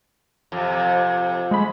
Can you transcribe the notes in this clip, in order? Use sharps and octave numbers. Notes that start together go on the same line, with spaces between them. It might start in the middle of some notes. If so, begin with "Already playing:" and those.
F2 C3
G#3 B5